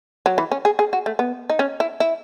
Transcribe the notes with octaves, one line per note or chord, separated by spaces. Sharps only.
F#3
E3
C#4
G#4
G#4
F#4
A3
B3
D#4
C#4
E4
E4